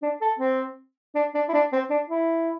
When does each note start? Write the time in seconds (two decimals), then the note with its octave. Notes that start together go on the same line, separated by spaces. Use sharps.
0.03 D4
0.21 A4
0.39 C4
1.15 D4
1.34 D4
1.48 E4
1.53 D4
1.72 C4
1.90 D4
2.10 E4